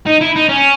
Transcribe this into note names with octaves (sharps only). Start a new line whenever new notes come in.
D#4
E4
D#4
C#4